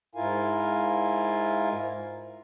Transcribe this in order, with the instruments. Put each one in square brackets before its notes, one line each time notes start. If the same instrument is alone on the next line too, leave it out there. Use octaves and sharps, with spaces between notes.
[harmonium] G#2 E4 F4 A#4 F5 G#5